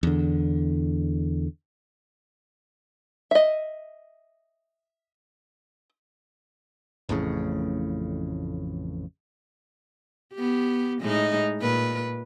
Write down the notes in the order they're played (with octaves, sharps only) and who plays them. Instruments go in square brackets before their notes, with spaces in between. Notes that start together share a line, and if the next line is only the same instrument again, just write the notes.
[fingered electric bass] E2 D3
[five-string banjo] D#5 E5
[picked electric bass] A1 F2 A2 C#3
[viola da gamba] B3 G4
A2 G#3 D#4
A#2 B4